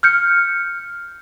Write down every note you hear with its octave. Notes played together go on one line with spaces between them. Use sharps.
F6 G6 C#7